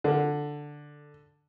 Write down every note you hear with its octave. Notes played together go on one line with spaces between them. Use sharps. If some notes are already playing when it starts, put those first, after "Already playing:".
D3